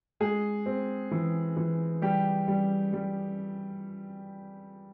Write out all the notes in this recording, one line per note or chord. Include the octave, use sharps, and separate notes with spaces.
G#3 G#4
C4
E3
E3
G3 G4
G3
G3